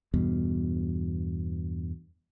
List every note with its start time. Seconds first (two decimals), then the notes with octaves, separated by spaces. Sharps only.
0.14 E2 G2 B2